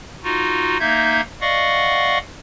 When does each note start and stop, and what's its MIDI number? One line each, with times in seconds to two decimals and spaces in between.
0.24 0.77 63
0.24 0.77 65
0.24 0.77 66
0.80 1.21 58
0.80 1.21 63
0.80 1.21 76
0.80 1.21 91
0.80 1.21 92
1.41 2.18 74
1.41 2.18 75
1.41 2.18 77
1.41 2.18 78
1.41 2.18 85